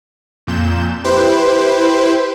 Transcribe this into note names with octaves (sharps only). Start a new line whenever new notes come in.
F2 A#2 G6 E7
E4 G4 B4 C5